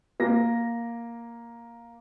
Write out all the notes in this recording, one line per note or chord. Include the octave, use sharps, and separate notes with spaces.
A#3 A#6